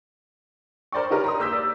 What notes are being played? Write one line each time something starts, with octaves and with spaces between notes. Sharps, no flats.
A#4 C5 D5 G5 C#6
D#4 G4 A#4 B4 C#5 D5
A#5 C6 D#6
A#3 E6 G6 B6
D5